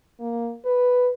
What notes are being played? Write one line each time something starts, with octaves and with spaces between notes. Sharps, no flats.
A#3
B4